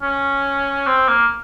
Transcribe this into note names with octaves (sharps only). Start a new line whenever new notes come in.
C#4
C4
A#3